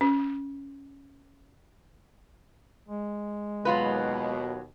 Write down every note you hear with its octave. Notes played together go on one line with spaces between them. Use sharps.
C#4
G#3
D#2 B2 F#3 F4 B4